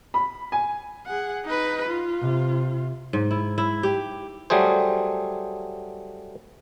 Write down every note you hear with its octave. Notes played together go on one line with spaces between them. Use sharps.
B5
G#5
G#4 F#5
D#4 B4
F4
C3
G#2
E4
E4
G4
F#3 G3 A3 G#4 C5